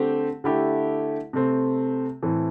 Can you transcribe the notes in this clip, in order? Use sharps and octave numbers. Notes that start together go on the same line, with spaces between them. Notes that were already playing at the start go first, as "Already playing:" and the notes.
Already playing: D3 A3 C4 G4
D3 A3 E4 G4
C3 A3 C4
A2 E3 C4